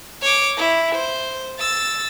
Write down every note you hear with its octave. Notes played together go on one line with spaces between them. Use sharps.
C#5 D6
E4
C5
E6 A6